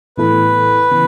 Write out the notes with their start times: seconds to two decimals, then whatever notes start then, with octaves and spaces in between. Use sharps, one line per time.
0.18 A2 E3 B3 E4 A4 B4
0.91 C#3 E3 B3